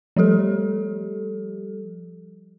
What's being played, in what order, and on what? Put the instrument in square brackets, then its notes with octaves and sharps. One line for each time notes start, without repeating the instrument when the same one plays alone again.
[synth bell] F3 G3 G4 A4